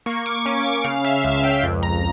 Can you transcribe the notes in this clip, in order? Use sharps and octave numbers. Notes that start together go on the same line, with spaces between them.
A#3 C#6
D6
D6
C#4 C#6
C#3 F5
E5
C#2 F5
G5
F2
A#5
A#5